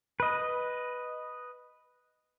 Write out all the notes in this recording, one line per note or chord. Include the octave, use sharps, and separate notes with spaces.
B4 D#5